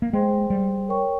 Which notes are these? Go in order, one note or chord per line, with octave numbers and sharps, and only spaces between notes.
A#3
G#3 G#4 C5 G5 C6
G3
A#4 C#5 G5 C#6